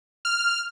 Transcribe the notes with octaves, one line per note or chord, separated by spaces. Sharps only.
F6